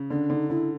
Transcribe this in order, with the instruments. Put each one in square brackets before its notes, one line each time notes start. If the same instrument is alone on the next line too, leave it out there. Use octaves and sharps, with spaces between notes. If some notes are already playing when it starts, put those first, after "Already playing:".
Already playing: [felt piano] C#3
[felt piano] D3 [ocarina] D4
[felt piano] D3 [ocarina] D#4
[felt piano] D3 [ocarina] E4